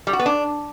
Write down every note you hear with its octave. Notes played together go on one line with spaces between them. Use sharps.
G3
F#4
B3
D4